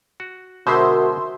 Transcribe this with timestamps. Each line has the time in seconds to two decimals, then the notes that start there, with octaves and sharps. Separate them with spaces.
0.20 F#4
0.67 B2 D3 G#3 F#4 A#4 C5 E5 C6